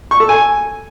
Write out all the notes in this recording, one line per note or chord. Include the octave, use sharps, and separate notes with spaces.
C#6
A4
G#5